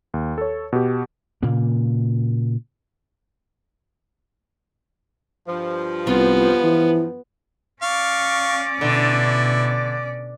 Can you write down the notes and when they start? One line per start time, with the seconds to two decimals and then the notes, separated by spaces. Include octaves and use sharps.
0.14 D#2
0.38 A4 C#5
0.73 B2 G4
1.42 A#2 C#3 A#3
5.48 G2 F3
6.07 C2 B3 F4
6.64 E3
7.83 C#4 D5 F5 C#6
8.81 B2 D3 E4